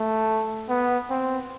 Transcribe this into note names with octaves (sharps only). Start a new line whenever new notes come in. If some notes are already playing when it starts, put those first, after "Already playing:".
Already playing: A3
B3
C4